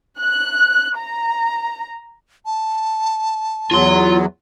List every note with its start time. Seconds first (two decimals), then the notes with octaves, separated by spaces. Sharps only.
0.21 F#6
0.98 A#5
2.46 A5
3.71 E2 F#3 F4 C6